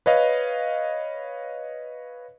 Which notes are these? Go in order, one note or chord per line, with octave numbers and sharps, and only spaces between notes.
B4 C#5 D#5 F5